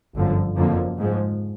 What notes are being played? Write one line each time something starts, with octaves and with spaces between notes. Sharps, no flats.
G1 F#2 D3 F3
F#1 F2 D3 F3 A#3
G#2 F3 G#3